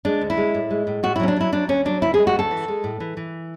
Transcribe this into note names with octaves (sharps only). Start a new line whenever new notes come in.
G#3 D4
D2
E4
G#3
A2
G#3
A2
A2 F#4
E4
F#3 C#4
D4
F#3 E4
F#3 D4
D2 C#4
F#3 D4
D2 E4
G#4
G#3
F#4
D2 A4
E3
G#3
A2
E3
E3